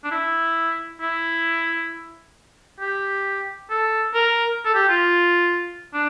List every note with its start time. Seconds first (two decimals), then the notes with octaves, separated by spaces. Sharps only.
0.04 D4
0.11 E4
1.01 E4
2.80 G4
3.70 A4
4.14 A#4
4.65 A4
4.75 G4
4.89 F4
5.94 D4